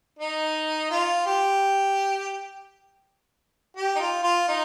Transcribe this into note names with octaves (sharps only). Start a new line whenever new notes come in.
D#4
F4
G4
G4
D#4
F4
F4
D#4